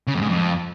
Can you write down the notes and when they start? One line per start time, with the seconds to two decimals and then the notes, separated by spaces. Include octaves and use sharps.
0.07 C#3
0.15 F2
0.22 G#2
0.29 F2